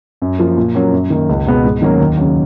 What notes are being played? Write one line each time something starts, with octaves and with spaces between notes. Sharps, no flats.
F#2
F3 A#3
A#2
F#3 A#3 C#4
F#2
D#3 A#3
C#2
B2 G#3 B3
G#2
D#3 F#3 A#3 C#4
D#2
C#3 F#3